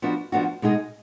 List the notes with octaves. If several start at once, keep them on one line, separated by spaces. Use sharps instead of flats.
F3 B3 D4 F#4
F3 B3 D4 F#4
B2 G#3 D#4 G#4